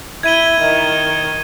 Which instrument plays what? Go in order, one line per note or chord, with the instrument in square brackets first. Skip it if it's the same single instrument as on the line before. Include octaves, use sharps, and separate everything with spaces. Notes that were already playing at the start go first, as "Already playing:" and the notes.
[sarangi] E4 [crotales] G#6 D#7 G7
[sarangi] D#3